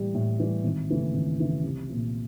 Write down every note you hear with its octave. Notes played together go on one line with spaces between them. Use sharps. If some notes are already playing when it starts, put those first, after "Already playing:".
Already playing: A2 E3 G3
A2
E3 G3
G#1
F#2 C#3 E3 A3
G#1
F#2 C#3 E3 A3
C2
A#2 F3